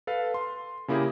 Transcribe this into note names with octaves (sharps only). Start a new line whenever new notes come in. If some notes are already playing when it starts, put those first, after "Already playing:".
A4 B4 F5
C6
C#3 A#3 E4 G4 G#4